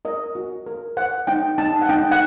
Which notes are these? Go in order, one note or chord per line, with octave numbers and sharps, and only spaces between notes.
A#4 D#5
F#4
A#4
C5 F#5
D#4 G5
D#4 A5
F#5
D#4 G5
F#5